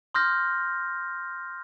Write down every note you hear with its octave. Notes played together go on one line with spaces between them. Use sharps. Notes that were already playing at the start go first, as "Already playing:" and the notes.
C6 D#6 F6 G6 A#6